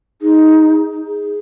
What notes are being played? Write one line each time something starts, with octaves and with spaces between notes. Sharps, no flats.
D#4 G#4
G#4